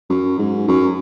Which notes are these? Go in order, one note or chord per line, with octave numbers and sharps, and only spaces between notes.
F#2
G#2
F#2